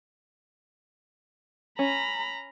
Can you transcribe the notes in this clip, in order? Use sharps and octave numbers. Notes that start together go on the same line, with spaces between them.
C#4 A#5 B5